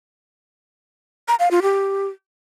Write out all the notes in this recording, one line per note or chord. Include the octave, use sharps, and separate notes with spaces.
A#5
F5
F4
G4